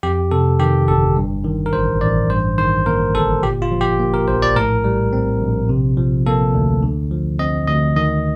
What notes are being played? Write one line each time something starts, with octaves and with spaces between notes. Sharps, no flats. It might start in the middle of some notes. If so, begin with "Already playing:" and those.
F2 G4
C3 A4
D#3 G4
G1 A4
G2
D#3
A#4
A1 C5
A1 D5
G2 C5
D#3 C5
A#3 A#4
G1 A4
A#2 G4
F4
F3
G4
A#3
A#4
A#1 C5
D5
A2 A#4
G3
C4
A#1
C3
F3
A#3 A4
D2
D3
F3
C4 D#5
D2 D#5
D#3 D#5